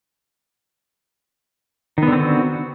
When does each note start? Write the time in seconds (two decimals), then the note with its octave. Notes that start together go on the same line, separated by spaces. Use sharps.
1.98 D#3
2.03 B3
2.07 D3
2.12 C4
2.17 F#4